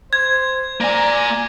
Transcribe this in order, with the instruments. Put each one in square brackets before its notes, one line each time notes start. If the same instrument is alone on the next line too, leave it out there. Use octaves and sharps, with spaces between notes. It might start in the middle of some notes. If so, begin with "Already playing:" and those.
[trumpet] C5 [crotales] G#6
[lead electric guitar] A#3 G#5 [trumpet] D5 [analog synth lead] A#5